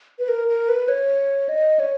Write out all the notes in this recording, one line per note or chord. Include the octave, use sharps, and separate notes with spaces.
B4
A#4
A#4
B4
C#5
D#5
C#5